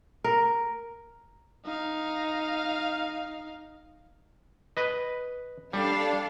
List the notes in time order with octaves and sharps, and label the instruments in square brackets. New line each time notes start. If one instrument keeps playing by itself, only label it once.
[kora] A#4
[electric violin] D#4 F5
[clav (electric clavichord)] B4 D#5
[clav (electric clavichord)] G3 [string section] D4 A4 F5